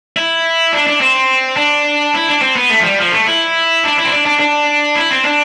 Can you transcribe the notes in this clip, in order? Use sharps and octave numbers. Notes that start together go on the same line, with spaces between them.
E4
D4
D4
C4
D4
E4
D4
C4
B3
A3
F3
G3
F3
A3
E4
D4
E4
C4
D4
D4
D4
E4
C4
D4